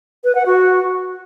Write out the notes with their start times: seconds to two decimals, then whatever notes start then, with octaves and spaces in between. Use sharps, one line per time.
0.24 B4
0.35 F#5
0.46 F#4